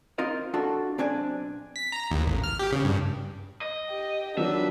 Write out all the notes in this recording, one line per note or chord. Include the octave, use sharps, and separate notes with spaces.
C4 D#4 F4 A#4 D#5
D4 F4 F#4 A4
B1 C4 D4 D5 G#5
B6
A#5
D#2
A1
F6
G4
C#3
G2
D#5
G4 G5
D#3 F3 F#3 D4 B4 E5